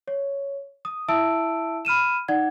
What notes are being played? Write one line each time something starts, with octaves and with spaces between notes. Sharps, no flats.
C#5
D#6
E4 E5 A5 E6 D7
B5 F6 D#7 E7
D#4 D5 F#5 G#6